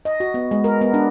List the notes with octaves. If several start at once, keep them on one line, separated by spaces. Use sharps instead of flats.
D#5
F#4
B3
G#3
A#4
B3
D4